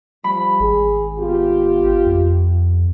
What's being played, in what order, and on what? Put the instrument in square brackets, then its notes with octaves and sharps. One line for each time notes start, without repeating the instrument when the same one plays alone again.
[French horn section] F3 G3 [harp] B5
[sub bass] G#1 [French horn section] G#4
[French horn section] B3 F4 G4
[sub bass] F2